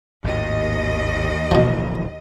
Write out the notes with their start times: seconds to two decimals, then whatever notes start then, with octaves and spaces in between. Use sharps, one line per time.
0.24 G#1 D#2 A2 D#5
1.51 D1 A#1 B2 E3 F3